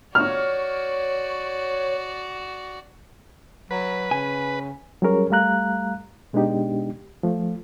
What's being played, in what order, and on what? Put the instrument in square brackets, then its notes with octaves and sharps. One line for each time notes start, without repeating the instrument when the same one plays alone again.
[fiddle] F#4 D5 [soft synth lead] C#5 [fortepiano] F6
[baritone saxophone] F#3 [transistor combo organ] B4
[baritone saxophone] C#3 [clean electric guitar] G#5
[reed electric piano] F#3 G3 C#4 G#4 A#4 C#5
G3 A3 F5 A#5 F#6
B2 G#3 B3 D4 D#4 G4
F3 A3